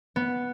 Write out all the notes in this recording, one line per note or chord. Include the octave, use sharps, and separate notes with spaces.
B3